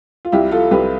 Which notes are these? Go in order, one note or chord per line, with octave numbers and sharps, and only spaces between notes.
F4
C2 E4 G4
F4 A4
C2 G4 B4